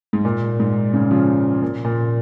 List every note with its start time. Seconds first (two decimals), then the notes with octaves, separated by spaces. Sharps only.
0.13 G#2
0.25 A#2
0.60 G#2
0.93 G#2 C#3
1.11 C#3 F3
1.62 A#2
1.85 A#2